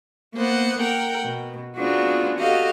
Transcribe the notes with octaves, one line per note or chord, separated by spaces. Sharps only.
A#3 B3 C5 F#5
A#4 F#5 G5
B2
B3 C4 D4 F4 F#4 G#4
F#4 G4 A4 D#5 F5